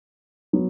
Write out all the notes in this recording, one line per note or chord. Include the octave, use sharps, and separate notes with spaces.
F#3 B3